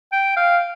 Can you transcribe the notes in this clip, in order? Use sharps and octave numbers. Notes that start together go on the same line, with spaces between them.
G5
F5